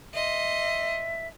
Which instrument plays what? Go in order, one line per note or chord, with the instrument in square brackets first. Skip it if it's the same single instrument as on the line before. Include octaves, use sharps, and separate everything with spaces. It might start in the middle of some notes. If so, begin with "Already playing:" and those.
[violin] D#5 C6 [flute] E5